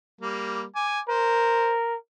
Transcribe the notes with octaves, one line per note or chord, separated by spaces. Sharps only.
G3 A#3
G#5 D6
A#4 C5